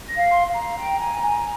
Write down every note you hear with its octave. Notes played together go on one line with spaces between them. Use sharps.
A#6
F5
C6
F5
A#5
G5
G#5
G#5